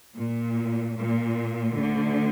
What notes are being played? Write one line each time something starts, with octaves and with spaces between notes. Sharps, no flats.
A#2
A#2
D2 D3